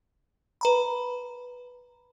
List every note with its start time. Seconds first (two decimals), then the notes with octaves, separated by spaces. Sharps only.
0.61 B4 A#5 B5